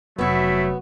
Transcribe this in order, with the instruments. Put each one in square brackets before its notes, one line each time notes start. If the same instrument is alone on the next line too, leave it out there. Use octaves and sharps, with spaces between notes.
[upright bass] F1 [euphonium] F#3 [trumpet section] A3 E4 [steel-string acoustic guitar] B3 F#4